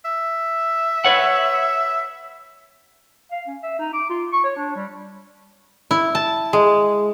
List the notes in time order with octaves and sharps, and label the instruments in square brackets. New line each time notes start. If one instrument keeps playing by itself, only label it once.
[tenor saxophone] E5
[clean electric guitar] B4 C#5 F#5
[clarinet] F5
C#4
E5
D#4
D6
F4
C#6
C#5
D4
G3
[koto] E4
A5
G#3